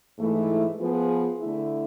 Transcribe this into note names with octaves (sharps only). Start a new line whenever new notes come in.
G#2 E3 A3 E4
F3 B3 F4 G#4 B4
D3 A3 E4